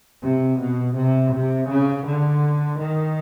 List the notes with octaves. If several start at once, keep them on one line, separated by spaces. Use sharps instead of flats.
C3
B2
C3
C3
C#3
D3
D#3